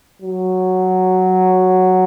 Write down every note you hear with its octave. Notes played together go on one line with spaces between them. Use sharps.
F#3